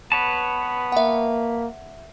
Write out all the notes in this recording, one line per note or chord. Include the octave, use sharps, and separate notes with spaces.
B3 B4 C#5 A5
A#3 E5 F#5